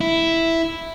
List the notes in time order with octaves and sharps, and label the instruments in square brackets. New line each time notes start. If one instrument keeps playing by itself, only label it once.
[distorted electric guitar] E4